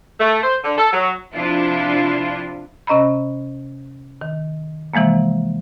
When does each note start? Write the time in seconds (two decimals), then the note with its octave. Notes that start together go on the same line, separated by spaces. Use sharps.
0.20 A3
0.43 C5
0.64 D3
0.78 A4
0.93 F#3
1.33 C3 F3 D4 E4 F4
2.87 C3 C#4 D#5 A#5 B5
4.21 D#3
4.94 C3 E3 F3 G#3 A#3